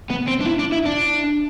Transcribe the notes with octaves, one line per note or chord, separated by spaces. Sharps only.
B3
C4
D4
E4
D4
E4
D4